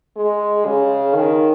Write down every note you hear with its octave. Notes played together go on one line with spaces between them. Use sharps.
G#3
C#3
D#3